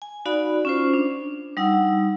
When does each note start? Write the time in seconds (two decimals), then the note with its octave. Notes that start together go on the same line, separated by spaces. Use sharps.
0.02 G#5
0.25 D#4 F#4 D5 F5 B5
0.65 C#4 F4 C5
0.94 D4
1.57 G3 D#4 F#5 E6